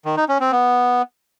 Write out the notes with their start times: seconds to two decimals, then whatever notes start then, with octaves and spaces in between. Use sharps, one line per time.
0.05 D#3
0.17 D#4
0.29 C#4
0.40 C4
0.52 B3